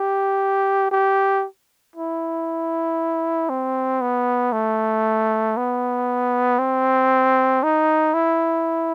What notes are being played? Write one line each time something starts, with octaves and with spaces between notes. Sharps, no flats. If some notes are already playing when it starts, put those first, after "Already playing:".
Already playing: G4
G4
E4
C4
B3
A3
B3
C4
D#4
E4